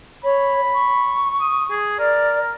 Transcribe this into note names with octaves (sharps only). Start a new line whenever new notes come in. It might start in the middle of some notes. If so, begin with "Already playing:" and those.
C#5 B5
C#6
D#6
G#4
A#4 D5